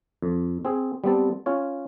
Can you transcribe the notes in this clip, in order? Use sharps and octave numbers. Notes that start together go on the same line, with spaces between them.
F2
C4 G#4
G3 B3 C4 A5
C#4 F4 C#5